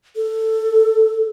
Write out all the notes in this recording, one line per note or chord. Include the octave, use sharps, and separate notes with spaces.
A4